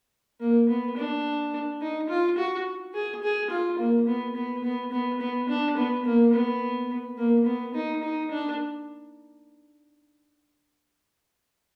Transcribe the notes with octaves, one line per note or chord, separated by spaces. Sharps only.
A#3
B3
D4
D#4
F4
F#4
G#4
G#4
F4
A#3
B3
B3
B3
B3
B3
D4
B3
A#3
B3
A#3
B3
D#4
D#4
D4